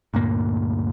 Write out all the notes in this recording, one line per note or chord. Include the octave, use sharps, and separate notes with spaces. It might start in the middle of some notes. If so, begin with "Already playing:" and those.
D2 G2 A#2 A#3